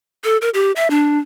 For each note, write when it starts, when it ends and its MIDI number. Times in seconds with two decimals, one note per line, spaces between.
0.24 0.37 69
0.42 0.50 70
0.54 0.72 67
0.76 0.88 76
0.90 1.19 62